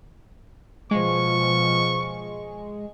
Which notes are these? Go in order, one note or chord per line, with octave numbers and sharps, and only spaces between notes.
B2 F3 G#3 C#6